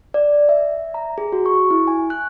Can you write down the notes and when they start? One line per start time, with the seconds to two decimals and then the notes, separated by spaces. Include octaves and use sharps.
0.14 D5
0.49 E5
0.94 A#5
1.18 G#4
1.32 F#4
1.46 C#6
1.71 E4
1.87 G#5
2.10 F#6